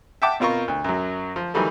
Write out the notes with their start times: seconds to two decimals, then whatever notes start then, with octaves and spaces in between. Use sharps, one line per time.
0.22 E5 F#5 G5 A5 D6
0.40 B2 C4 F4 A#4 A#5 C#6
0.68 D2
0.84 F#2 F#3
1.36 F3
1.54 D#3 E3 F#3 G3 A3